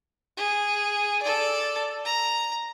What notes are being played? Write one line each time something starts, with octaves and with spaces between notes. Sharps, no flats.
G#4
A4 D5
A#5